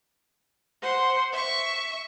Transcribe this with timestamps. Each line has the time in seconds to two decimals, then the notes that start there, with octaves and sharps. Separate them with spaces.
0.82 C5 F#5 C6
1.32 E5 C#6